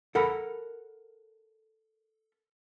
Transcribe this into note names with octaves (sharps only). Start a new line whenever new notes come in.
A4 A#4 F#5 B5